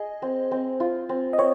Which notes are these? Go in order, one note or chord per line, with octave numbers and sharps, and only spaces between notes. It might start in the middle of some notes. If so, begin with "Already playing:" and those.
Already playing: G#4 D#5
C4
C4
F4
C4
D#5
C4 C#5